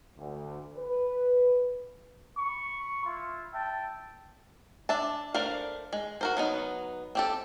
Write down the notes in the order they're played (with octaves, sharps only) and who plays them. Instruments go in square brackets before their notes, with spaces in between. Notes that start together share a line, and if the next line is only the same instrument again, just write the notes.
[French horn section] D2
B4
[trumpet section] B5 C#6
E4 F4
E5 G5 A5
[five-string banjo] D4 E5 A5
A3 D4 A#4 C5 F5
G#3
F#4 A#4 C5
F#3 B3 D#4
C4 G4 A4